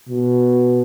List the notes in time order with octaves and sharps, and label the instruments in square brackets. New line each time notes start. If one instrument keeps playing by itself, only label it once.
[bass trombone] B2